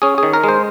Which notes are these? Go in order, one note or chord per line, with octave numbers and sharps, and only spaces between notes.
C#4 G#4
D#3 G#4
A#4
G#3
C5